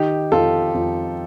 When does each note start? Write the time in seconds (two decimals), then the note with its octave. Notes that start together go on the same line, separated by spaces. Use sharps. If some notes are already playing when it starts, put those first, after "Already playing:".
Already playing: D#3 D#4 G4
0.32 F2 F4 A4
0.74 F2